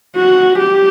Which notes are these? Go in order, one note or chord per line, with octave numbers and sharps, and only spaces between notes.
F#4
G4